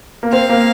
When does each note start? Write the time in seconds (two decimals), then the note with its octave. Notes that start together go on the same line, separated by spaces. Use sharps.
0.23 A#3
0.32 C4 F5
0.49 A#3